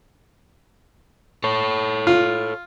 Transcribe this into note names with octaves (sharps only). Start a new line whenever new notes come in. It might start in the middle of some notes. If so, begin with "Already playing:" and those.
A4 C#5
F4